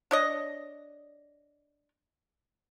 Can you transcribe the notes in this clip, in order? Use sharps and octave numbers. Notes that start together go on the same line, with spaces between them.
D4 C#5 D#5